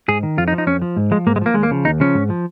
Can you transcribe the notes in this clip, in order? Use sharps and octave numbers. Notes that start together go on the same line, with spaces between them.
G#2 G#4
D#3
F2 F4
D#4
F3
D#4
F2 C#4
F3
G#2
F3 G#3
G#2 A#3
G#3
F3 A#3
D#2 G#3
A#3
C#3 F3
D#2 D#4
C#3 F3 C#4
G#2
F3